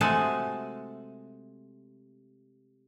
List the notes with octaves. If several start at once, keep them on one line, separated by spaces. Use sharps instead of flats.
C3 G#3 A3 F#4 G#5 A5